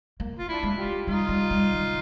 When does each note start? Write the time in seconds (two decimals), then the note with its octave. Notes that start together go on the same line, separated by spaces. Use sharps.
0.20 A#3
0.39 F4
0.48 D4 E4
0.63 G#3
0.77 F4 G4
1.07 G3 D#4 F4
1.29 G3
1.51 G3
1.73 D#3